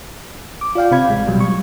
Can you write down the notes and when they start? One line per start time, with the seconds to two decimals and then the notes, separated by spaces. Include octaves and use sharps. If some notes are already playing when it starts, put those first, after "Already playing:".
0.61 D6
0.75 F4 D5 F5 G5
0.91 C3 C4 F5 B5 G#6
1.08 A1 G#3
1.27 A1 B2 F#3 G3
1.41 C#6